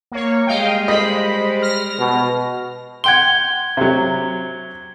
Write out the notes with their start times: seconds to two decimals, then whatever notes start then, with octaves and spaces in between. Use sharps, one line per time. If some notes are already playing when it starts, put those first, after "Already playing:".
0.12 A#3 C#5
0.47 G3 G#3 D#5 F5 G5
0.88 C5 D#5 B5
1.62 F6 A#6
1.99 B2
3.04 F#5 G5 C6 G#6 G7
3.77 C3 F#3